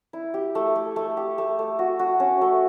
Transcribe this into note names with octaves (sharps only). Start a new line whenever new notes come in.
E4
G4
A3
A3
A3
G4
A3
A3
F#4
F#4
C#4
A3